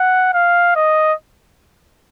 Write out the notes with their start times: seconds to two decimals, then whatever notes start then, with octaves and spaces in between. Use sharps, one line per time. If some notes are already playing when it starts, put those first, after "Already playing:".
Already playing: F#5
0.34 F5
0.75 D#5